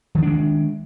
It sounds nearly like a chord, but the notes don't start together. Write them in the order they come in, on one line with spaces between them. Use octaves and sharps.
F3 D#3 D4 G#3